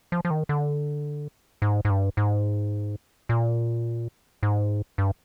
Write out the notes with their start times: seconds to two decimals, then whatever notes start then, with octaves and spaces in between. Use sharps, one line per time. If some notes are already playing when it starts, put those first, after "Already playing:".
0.12 F3
0.25 F3
0.30 D#3
0.49 D3
1.62 G#2
1.85 G#2
1.90 G2
2.17 G#2
3.29 A#2
4.43 G#2
4.98 G2